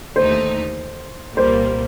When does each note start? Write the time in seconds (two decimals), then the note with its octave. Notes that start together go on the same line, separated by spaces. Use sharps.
0.16 D#2 D3 A3 D#4 C5
1.37 C2 A#2 G3 A#3 C5